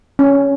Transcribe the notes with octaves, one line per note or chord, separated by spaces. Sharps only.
C#4